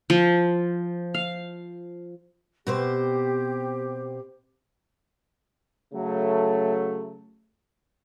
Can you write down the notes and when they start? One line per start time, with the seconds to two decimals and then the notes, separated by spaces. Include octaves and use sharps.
0.10 F3
1.14 F5
2.67 B2 C4 G4 C5
5.94 C#3 F#3 A3